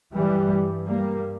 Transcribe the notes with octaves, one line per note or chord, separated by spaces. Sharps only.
G2 E3 G3
G3 A#3